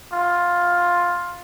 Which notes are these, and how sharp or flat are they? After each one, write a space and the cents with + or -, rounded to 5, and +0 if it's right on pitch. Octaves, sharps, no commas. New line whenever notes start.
F4 +10